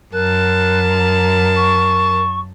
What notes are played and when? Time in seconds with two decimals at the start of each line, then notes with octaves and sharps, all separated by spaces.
0.13 F#2 A#4 A5 F#6
0.89 A#5
1.55 C#6